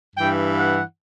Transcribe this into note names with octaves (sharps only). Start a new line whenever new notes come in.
G2 E3 G5
F#5